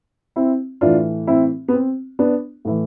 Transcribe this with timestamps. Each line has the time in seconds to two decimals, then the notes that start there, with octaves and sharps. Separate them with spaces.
0.36 C4 E4
0.81 A2 E3 D4 F4
1.27 C4 E4
1.68 B3
1.73 C4
2.19 B3 D4
2.65 A2 E3